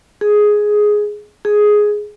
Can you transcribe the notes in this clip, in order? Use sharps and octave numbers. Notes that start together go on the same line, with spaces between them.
G#4
G#4